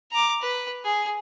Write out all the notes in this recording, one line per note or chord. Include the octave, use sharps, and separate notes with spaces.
A#5 D6
B4
G#4